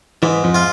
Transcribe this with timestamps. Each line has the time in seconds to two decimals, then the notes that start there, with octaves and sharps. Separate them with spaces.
0.23 G#2 E3
0.44 F2 F3
0.54 F4